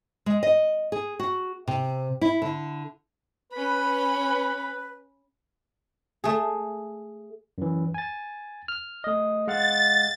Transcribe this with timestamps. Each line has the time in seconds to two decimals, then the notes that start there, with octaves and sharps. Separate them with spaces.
0.26 G#3
0.43 D#5
0.92 G#4
1.19 F#4
1.68 C3
2.21 E4
2.42 D3
3.53 C#4 B4 B5
6.24 A3 G#4
7.58 F#2 E3
7.94 G#5 A6
8.68 F6
9.04 A3 D#5
9.48 G#3 F5 F#5 A6